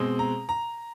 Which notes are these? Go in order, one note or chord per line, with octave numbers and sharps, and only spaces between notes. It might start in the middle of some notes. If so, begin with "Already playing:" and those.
Already playing: B2 G#3 C4
A#5
A#5